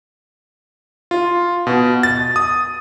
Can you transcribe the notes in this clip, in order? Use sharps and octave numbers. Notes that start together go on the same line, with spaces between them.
F4
B2
A6
D#6